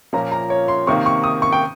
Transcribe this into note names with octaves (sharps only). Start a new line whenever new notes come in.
A#2 F3 A#3 C#4 A#5
A#5
C#5
C6
C3 D#3 A#3 C#6
C#6
D#6
C#6
G5